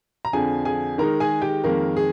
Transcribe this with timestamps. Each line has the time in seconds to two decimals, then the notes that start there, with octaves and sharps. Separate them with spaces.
0.25 A#5
0.33 F2 D3 F3 G#4 G#5
0.65 G#4 G#5
0.98 D#3 G#3 D#4 A#4 A#5
1.20 G#4 G#5
1.42 G4 G5
1.64 F2 D#3 G#3 A#3 A#4
1.97 G#4